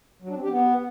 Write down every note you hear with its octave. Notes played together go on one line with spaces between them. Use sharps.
F#3
D4
C4
G4
B3